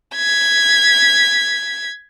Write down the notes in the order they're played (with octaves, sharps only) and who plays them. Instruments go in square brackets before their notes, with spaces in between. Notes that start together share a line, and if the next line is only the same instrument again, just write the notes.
[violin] G#6 B6